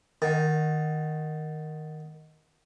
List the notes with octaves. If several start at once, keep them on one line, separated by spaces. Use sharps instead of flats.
D#3 D#5 F#5 A6